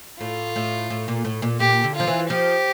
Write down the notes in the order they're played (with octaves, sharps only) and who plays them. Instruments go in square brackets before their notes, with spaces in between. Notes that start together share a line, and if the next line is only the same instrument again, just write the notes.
[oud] A2 [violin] F4
[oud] A2
A2
A#2
A2
A#2
[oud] A#2 [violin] G4
[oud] D3
[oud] F3 [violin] F4
[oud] E3
[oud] F3 [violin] G4